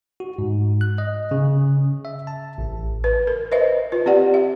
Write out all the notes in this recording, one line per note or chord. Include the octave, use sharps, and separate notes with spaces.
F#4
G#2
F#6
D#5
C#3
E5
A5
A1
B4
A#4
B4 C5 D#5 E5
F4 B4
C4 G4 D5 F#5
E5